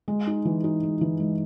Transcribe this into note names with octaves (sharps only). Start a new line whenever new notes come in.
G#3
D#4
E3
D#4
G#3
E3
G#3